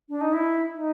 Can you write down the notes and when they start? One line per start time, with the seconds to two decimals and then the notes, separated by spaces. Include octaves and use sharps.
0.09 D4
0.21 D#4
0.33 E4
0.74 D#4